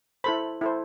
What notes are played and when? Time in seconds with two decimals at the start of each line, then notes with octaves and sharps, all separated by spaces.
0.24 E4 A4 C5 B5
0.61 E4 A4 C5